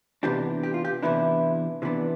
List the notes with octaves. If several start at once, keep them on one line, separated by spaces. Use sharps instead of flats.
C3 E3 B3 D4 G4
G4
F4
G4
C3 E3 B3 D4 E4
C3 E3 B3 D4